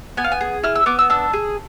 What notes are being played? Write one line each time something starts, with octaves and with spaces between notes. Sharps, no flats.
B3 G#5
F5
G#5
G#4
E4 F6
E6
B3 D6
E6
D4 E6
G#4